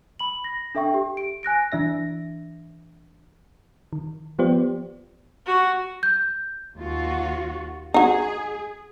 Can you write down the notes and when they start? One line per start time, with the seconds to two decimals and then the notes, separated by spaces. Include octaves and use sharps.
0.19 B5 F#7
0.44 A#6
0.75 D4 A4 E5 G5 C#6
0.94 G4
1.17 D7
1.43 G#5 F#6 A#6 D7
1.72 E3 D4 E5 A#6
3.93 D#3
4.39 F3 B3 F4 G4 C5 D5
5.47 F#4
6.03 G6
6.77 D#2 F4 F#4
7.94 D#4 F#4 G#4